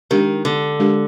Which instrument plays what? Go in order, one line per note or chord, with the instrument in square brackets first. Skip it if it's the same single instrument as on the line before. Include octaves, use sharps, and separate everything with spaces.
[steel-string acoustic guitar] D#3 [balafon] G#3 D4 G4 A#4
[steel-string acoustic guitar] D3
[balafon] G#3 D4 G4 A#4